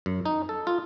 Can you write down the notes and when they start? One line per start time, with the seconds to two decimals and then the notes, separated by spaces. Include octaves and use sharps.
0.06 F#2
0.25 D#4
0.49 A4
0.67 F4